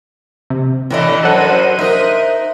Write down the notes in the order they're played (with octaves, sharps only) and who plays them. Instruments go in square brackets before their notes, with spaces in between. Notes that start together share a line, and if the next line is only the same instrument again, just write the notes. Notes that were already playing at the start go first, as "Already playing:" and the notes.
[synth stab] C3
[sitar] A2 E3 A3 [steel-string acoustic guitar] D4 C#5 D#5
[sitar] F#2 F#3 [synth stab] A4 F#5 [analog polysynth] C5 F#6 D#7
[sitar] D#4 D#5 [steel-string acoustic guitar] A#4 E5